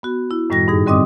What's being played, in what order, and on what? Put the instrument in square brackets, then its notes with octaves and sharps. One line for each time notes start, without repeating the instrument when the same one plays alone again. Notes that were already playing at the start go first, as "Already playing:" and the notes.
[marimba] B3 F#4
E4
F#2 A2 D#3 G3 F#4 A#6
G2 D#4 G#4
D3 G3 C4 D#5 D6 D#6